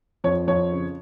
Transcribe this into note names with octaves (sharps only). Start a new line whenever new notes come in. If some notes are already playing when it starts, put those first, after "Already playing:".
F2 C#5
F2 C#5
C#3